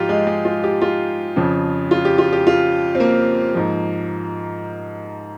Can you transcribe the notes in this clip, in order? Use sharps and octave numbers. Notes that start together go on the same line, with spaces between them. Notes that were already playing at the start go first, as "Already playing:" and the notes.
Already playing: G#2 F3 F4 G4
G#3
G#3
F4
G4
F4
F2 C#3 F3
F4
G4
F4
G4
F4
C4
A#3
G#2 F3